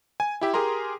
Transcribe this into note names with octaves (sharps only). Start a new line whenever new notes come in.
G#5
E4 G4 E5
G4 G#4 A#4 A#5 C6